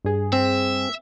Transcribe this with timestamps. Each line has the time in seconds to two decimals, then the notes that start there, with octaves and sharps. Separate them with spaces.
0.05 G2 G#4
0.33 C4 E5